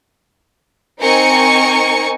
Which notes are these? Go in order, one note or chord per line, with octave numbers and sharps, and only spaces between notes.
C4 D#4 A#4 G#5 C#6 C#7